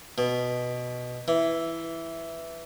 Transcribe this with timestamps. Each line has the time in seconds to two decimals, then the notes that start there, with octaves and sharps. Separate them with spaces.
0.18 B2
1.28 E3